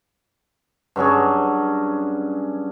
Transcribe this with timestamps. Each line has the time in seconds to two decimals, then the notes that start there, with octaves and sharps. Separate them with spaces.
0.96 G2 F#3 C#4 G#4